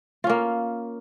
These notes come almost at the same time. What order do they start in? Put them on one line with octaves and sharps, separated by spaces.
F4 C#4 A#3